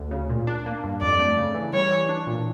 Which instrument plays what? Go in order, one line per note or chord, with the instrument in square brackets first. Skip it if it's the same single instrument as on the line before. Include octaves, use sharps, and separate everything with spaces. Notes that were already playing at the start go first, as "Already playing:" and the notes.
Already playing: [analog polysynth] D2
C#3
A#2
D4
A#3
G2
[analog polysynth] F2 [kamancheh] D5
[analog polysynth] A3
C#3
E3
[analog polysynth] G3 [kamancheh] C#5
[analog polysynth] E3
D4
A#2